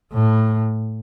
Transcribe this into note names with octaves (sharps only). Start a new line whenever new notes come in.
A2